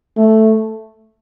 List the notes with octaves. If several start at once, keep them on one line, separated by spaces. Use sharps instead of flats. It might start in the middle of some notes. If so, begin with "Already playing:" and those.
A3